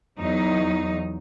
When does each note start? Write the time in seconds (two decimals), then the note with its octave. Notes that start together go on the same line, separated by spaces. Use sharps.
0.19 E2 F#3 D#4